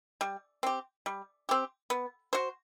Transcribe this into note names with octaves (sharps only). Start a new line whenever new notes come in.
G3
C4 G4
G3
C4 G4
B3
F#4 C5